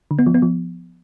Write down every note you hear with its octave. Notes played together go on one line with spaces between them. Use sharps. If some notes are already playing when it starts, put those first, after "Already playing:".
D3
B3
F3
B3
F3